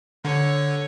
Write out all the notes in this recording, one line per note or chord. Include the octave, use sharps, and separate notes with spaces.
D3 C#5